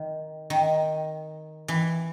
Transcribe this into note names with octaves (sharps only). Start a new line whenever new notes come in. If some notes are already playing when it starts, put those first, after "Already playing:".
Already playing: D#3
D#3
E3